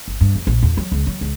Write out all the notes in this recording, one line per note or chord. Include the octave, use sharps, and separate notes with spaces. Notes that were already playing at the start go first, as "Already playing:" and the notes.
G1
G2
F2
A#1
E2
F#3
C#2
F#3
C#2